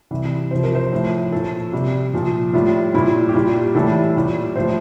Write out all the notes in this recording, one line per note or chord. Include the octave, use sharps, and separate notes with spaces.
C3 E3 G3
C3 F3 C5
A#4
C5
A2 F3 C5
A#2 F3 A4
C3 G3
A#2 F3
A2 G3 F4
A#2 G3 E4
G4
A#2 G3 F4
G4
A2 E3 G3 A4
A#2 G3
A2 F3 C5